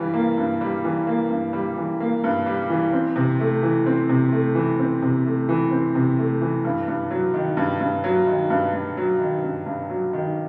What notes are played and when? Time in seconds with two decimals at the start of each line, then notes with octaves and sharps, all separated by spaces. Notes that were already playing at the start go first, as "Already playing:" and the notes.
Already playing: G2 E3 G3
0.14 A#3
0.38 G2
0.61 G3
0.84 E3
1.07 A#3
1.30 G2
1.53 G3
1.77 E3
2.00 A#3
2.24 G2
2.46 G3
2.70 E3
2.93 C4
3.16 C3
3.40 A3
3.62 E3
3.86 C4
4.09 C3
4.32 A3
4.55 E3
4.79 C4
5.02 C3
5.26 A3
5.49 E3
5.71 C4
5.95 C3
6.18 A3
6.41 E3
6.65 G2
6.88 G2
7.11 F#3
7.34 D#3
7.57 G2
7.80 G2
8.04 F#3
8.27 D#3
8.50 G2
8.73 G2
8.97 F#3
9.19 D#3
9.44 G2
9.66 G2
9.89 F#3
10.13 D#3